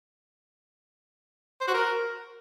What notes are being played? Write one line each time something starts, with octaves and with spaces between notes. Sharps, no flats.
C5
F#4
A#4